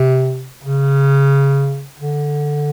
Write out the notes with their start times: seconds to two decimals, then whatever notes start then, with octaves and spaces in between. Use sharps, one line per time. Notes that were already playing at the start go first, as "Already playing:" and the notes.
Already playing: C3
0.64 C#3
2.00 D3